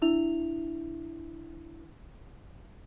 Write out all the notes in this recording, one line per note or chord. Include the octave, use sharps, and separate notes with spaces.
D4 E4 E5 F7